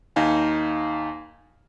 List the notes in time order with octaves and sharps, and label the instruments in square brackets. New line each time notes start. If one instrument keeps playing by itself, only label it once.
[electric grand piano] D#2 D#4 F5 G#5